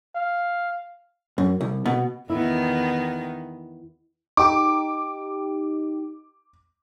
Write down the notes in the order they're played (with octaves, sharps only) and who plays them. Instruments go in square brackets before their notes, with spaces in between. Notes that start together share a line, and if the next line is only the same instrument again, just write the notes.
[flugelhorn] F5
[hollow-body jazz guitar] F#2
C2
B2
[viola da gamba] E2 D#3 B3 [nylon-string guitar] E4
[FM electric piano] D#4 G4 [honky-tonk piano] D6